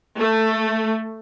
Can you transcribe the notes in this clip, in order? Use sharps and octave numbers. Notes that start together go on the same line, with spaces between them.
A3